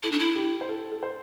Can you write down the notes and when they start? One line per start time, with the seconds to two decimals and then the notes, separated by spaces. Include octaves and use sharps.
0.03 E4 A4
0.12 D4
0.19 E4
0.35 G4
0.61 C5
0.69 A4
0.92 A4
1.03 C5